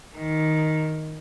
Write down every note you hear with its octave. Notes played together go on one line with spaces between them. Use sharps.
D#3